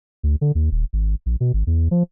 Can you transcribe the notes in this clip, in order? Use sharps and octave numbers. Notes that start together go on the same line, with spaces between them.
D2
D3
D#2
D#1
G#1
A#1
B2
G#1
E2
F3